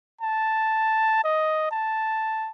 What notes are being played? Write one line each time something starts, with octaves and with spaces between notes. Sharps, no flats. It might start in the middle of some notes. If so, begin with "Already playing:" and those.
A5
D#5
A5